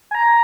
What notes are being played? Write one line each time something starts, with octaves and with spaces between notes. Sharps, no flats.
G#5
A#5